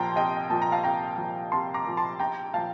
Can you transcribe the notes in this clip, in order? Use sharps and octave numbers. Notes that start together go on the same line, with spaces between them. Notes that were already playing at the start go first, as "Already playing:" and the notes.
Already playing: C2 A#2 F3 G5 A5 A#5 C6
C2 D#5 G5
A#2 F3 A5
A#5
F5 A5
C2 G5 A#5
A#2 F3
C2 A5 C6
A#5 D6
A#2 F3
A5 C6
A#1 G5 A#5
A#2 F3 F5 A5